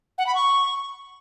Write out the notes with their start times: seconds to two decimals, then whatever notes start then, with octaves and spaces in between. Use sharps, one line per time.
0.18 F#5
0.27 B5
0.35 C#6